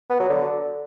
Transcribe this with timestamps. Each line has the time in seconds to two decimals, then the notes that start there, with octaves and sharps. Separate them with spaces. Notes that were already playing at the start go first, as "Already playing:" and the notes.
0.10 B3
0.20 F#3
0.29 D3